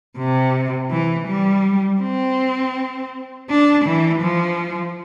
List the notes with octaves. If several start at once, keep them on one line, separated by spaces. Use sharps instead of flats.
C3
E3
G3
C4
D4
E3
F3